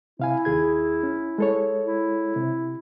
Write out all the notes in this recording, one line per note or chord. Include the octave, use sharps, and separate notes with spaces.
C3 E4 F5 G#5
D#2 G#4 G#6
C#4
G#3 A4 C#5
E4
C3